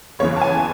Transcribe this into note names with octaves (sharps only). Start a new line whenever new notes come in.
F#1 E2 C#3 E3 C#5
A5
G#5